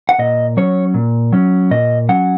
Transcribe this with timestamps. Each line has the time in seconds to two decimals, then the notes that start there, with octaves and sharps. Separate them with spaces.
0.09 F#5
0.19 A#2 D#5
0.57 F#3 C#4 C#5
0.94 A#2
1.33 F#3 C#4
1.71 A#2 D#5
2.09 F#3 C#4 F#5